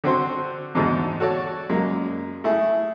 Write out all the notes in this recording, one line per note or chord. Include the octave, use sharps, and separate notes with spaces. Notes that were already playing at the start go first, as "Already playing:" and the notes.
D3 C4 F#4 C5 C6
E2 G#2 B2 D3 G#3 A3
F#4 A4 C#5 D5
F#2 G#3 A#3
A3 E4 G#4